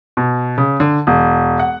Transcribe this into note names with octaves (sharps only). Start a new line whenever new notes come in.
B2
C#3
D3
E1
F#5